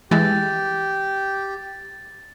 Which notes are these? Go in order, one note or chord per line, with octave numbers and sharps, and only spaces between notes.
E3 G#3 G4 A6